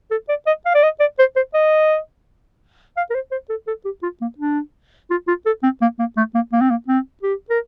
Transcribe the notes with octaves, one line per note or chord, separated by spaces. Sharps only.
A4
D5
D#5
F5
D5
D#5
D5
C5
C5
D#5
F5
A#4
C5
C5
A4
A4
G4
F4
A#3
D4
F4
F4
A4
C4
A#3
A#3
A3
A#3
A#3
C4
A#3
C4
G4
A#4